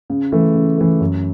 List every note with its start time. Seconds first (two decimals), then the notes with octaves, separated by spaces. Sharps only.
0.10 C#3
0.32 E3 A3
0.55 C#3
0.78 E3 A3
1.01 F#2